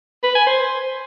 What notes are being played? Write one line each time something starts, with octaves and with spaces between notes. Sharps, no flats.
B4
G#5
C5